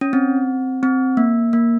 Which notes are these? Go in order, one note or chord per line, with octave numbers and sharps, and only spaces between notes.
C#4
C4
C4
A#3
A#3